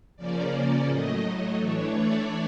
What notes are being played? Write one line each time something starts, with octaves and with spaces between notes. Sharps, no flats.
C#3 F3 A#3 C#4 D5
A2 F#3 A3 D#5
D#5
E3 A3 D4 C#5
D5